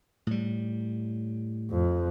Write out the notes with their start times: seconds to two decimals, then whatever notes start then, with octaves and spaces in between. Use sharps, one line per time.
0.27 A2 G3
1.71 F2